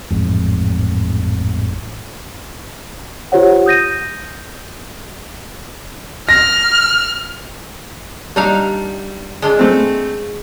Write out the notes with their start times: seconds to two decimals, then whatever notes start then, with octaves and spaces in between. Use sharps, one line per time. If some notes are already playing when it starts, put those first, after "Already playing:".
0.11 A1 F2 G#2
3.32 F4 G4 C5 C#5 F#5
3.66 D#6 G6 A#6 D#7
6.29 F6 A#6
8.36 G3 D4 D#4 F5
9.42 G#3 D4 F4
9.59 A3 C4